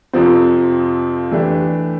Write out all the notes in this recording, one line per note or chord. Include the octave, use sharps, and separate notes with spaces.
F2 C3 F3 C4
E3 A3 D4 G4